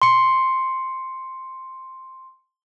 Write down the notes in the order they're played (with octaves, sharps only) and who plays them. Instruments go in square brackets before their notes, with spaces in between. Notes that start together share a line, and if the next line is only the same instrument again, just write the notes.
[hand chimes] C6 C#7